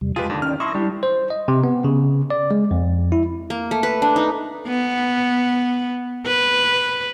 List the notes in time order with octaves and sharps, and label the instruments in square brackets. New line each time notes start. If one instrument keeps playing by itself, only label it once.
[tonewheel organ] E2 C3 G3
[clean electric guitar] G#3 G4 G#4 [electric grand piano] F4 B4 [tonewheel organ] A5
[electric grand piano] D#2 [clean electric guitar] D3
[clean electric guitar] D#3 [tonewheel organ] C#4 D5 G5 [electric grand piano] F6
[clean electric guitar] E4 [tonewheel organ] A5 D#6 A#6 [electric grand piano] C6 C#6
[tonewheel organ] G3 E4 [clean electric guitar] D4 G4
[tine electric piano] C5
D#5
C3
B3
C#3
D5
G#3
F2
E4
[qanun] A#3
A3
B4
D4
D#4
[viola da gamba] B3
B4